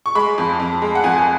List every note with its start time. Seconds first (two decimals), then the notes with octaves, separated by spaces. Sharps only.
0.06 C#6
0.15 G#3 B5
0.38 F2
0.60 F2
0.82 G#3
0.95 F#5
1.04 F2 G#5